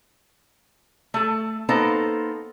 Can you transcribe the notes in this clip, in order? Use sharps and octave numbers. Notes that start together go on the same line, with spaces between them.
A3 A4
A#3 B3 D#4 A4 C5